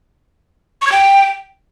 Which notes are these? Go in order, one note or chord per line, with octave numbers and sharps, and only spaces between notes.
C#6
G#6
G5